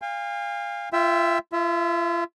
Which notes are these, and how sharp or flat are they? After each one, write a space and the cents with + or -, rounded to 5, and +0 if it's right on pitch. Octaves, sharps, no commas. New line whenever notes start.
F5 +0 G#5 -45
F4 -25 E5 +10 G5 +0
F4 -35 E5 +0